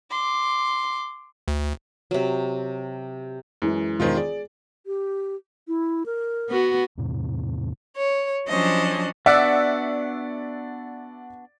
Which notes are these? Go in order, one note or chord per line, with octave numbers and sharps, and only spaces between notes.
C6 D6
D2
C3 F#3
F#2 E3 G#3
E1 D#3 G#3 F4 C5
G#4 D5
G4
E4
A#4
B3 F#4
E2 A2 C3
C#5
F3 F#3 C#4 D4 C5 D#5
B3 D4 F#4 D5 E5 F#5 E6